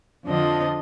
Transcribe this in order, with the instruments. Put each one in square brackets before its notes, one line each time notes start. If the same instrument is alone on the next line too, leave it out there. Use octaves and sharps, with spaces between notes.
[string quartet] F2 D3 F3 D4 D#5